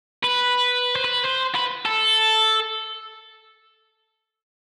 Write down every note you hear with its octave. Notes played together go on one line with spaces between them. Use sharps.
B4
C5
B4
C5
B4
A4